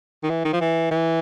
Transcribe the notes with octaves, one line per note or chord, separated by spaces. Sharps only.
D#3
E3
D#3
F3
E3
E3